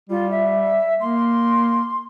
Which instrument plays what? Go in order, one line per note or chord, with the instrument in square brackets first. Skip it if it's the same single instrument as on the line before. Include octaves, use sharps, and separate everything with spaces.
[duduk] G3 [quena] F4
[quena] E5
[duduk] A#3 [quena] C6